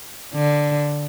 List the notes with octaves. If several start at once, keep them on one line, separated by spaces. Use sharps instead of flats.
D3